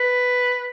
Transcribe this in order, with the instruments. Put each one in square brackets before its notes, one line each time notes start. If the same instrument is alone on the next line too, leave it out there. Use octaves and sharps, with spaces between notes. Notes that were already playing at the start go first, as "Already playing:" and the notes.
Already playing: [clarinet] B4